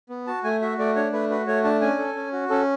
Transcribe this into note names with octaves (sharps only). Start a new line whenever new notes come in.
B3
F#4 A5
A3 G#5
F#4 E5
A3 D5
D4 C#5
A3 B4
F#4 B4
A3 C#5
D4 A5
C#4 G#5
A4
C#4
F#4
C#4 A4